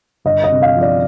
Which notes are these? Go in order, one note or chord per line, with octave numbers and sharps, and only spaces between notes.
G1 D#5
D#5
C3
F5
F3
D5